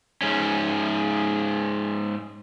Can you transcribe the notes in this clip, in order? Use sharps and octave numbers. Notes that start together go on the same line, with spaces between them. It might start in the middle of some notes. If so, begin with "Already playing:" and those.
G#2 C#4